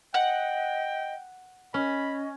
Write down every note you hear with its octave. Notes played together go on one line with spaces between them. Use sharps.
D#5 F#5 G5
C#4 D#5 B5